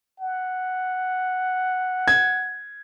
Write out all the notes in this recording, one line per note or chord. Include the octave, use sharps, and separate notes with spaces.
F#5
G#6